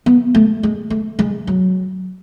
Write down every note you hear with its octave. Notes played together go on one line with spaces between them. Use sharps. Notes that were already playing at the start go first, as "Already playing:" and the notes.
B3
A3
G#3
A3
G#3
F#3